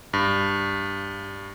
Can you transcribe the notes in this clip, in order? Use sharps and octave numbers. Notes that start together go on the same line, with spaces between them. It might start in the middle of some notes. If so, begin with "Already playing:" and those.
G2